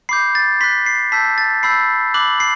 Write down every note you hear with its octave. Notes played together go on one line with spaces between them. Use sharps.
B5 D6 G6 C7
A6
C6 F#6 B6
C7
A5 E6 G6 B6
A6
B5 E6 G6 C7
B5 D6 F#6 F#7
C7